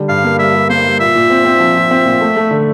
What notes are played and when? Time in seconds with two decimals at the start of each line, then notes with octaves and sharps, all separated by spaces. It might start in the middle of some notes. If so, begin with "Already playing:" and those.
Already playing: D3 G3
0.09 G2 F5
0.24 A#3
0.39 G3 E5
0.54 G3
0.70 A#3 C5
0.85 G3
1.00 A#2 E5
1.15 A#2
1.30 C4
1.45 C4
1.60 F3
1.75 F3
1.91 C4
2.05 A#2
2.21 A3
2.36 A3
2.51 D3